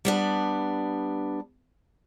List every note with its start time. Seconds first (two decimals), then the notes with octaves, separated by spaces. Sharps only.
0.05 G3 B3 D4